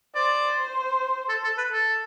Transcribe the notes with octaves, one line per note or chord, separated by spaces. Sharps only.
C5 D5
A4
A4
B4
A4